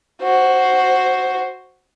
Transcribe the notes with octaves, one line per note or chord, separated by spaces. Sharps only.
F#4 C5